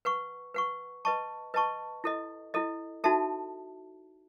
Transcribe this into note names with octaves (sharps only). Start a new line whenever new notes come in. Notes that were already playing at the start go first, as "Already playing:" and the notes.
B4 F#5 C#6
B4 F#5 C#6
B4 D#5 A5 C#6
B4 D#5 A5 C#6
E4 A4 D#5
E4 A4 D#5
D#4 F#4 A4 E5 A5